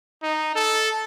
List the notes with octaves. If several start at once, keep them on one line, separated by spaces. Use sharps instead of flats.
D#4
A4